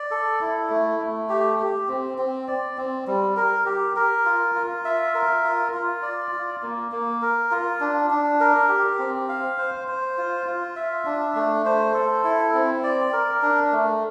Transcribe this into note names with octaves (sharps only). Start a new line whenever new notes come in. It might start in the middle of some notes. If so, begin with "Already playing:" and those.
Already playing: D5
A4
E4
A3
A3
G4
G4
C4
C4
D5
C4
G3
A#4
G4
A#4
F4
F4
E5
A#4
F4
F4
D5
F4
A#3
A#3
A#4
F4
D4
D4
A#4
G4
C4
F5
C5
C5
F4
F4
E5
D4
A3
C5
A4
E4
C4
D5
A#4
D4
A3